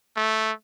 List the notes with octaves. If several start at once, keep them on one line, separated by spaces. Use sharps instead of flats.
A3